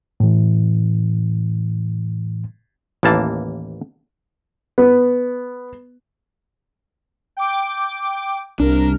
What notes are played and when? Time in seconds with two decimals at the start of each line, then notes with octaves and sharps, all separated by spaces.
0.20 A2 E3
3.03 A1 D#2 E3 A#3 A5
4.78 B3
7.37 G5 D6
8.60 C2 D4 A#4